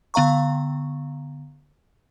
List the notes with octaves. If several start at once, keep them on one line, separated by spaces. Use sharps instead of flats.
D3 B3 F5 A#5 C#6